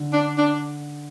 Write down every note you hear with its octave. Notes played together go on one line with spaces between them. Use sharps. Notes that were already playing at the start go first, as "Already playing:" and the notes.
Already playing: D3
D4
D4